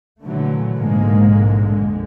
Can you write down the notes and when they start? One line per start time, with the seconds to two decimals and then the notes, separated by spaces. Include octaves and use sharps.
0.21 A#2 D3 E3 F#3 A3
0.76 A#1 G#2 B2 D3 G#3 A#3
1.65 F2 D3 G#3